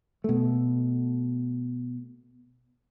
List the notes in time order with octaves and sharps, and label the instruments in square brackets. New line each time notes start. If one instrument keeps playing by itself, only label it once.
[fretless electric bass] B2 A3